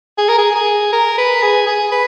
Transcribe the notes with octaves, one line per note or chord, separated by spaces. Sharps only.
G#4
A#4
G#4
G#4
A#4
B4
G#4
G#4
B4